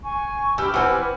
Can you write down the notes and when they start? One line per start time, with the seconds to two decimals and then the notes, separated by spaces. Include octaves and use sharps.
0.02 G#5 C#6
0.58 G4 B5 D6 E6 F6
0.74 E3 C4 B4 F#5 G#5